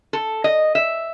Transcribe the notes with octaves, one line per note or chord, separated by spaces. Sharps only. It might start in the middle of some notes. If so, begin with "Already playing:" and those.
A4
D#5
E5